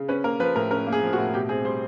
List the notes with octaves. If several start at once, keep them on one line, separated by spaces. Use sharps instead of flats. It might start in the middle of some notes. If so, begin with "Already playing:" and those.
Already playing: C#3
C#4 B4
A#3 A#4
F3 B4
A2 A#4
C#4 A#4
A#3
G#4
F3
F#4
A2
B2 G4
C4 G#4
G3 C5